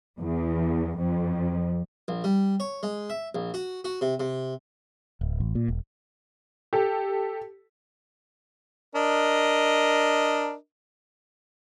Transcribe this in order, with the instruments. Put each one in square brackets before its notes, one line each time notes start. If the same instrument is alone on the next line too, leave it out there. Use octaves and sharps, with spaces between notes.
[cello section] E2
F2
[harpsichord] A#1
G3
C#5
G#3
E5
A#1
F#4
F#4
C3
C3
[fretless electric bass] D1
A1
A#2
E1
[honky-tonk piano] G4 A4
[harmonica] D4 A#4 D#5